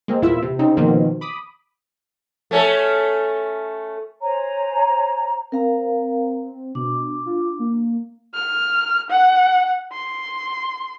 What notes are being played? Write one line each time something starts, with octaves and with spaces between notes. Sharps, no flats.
G#3 A#3 C4
E2 A#2 E4 F4 E5
C3
C#3 C4 D#4
B2 D#3 F3 A#3 C4
B5 D6 D#6
A3 C#4 A4
C5 C#5 G#5 A#5
C4 A#4 F5 A#5
B2 D4 D6
F4
A#3
F6
F#5
C6